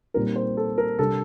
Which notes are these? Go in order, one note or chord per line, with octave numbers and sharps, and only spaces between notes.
A#2 G3 C4 D#4 A#4
C5
A4
A#4
C3 G3 D4 A4